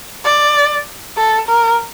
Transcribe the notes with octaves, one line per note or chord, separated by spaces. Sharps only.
D5
A4
A#4